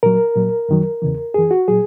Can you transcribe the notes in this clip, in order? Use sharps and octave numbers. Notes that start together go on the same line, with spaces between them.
A#2 F#3 A#4
A#2 F#3
F#2 D#3 F#3
E2 C#3 E3
F#2 E3 G#4
F#4
A#2 F#3 G#4